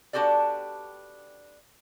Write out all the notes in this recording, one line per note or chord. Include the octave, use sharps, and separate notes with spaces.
B3 D4 F#4 G4 A4 D5